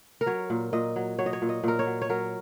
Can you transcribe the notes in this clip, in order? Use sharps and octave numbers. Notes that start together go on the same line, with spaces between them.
A#4
F#3 C#5
A#2
A#2 D#5
F#3
F#3 C#5
D#5
C#5
A#2
D#5
A#2 A#4
C#5
F#3
C#5
F#3 A#4